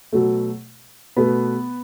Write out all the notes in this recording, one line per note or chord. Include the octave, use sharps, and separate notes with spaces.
B2 F#3 A3
B2 A3 B3 B4